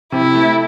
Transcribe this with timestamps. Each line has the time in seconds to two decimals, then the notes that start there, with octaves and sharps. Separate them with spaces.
0.12 C3 E4
0.34 A3